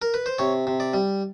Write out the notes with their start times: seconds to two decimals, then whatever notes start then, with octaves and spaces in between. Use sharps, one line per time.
0.02 A#4
0.14 B4
0.26 C5
0.38 C3 C#5
0.67 C3
0.80 D5
0.94 G3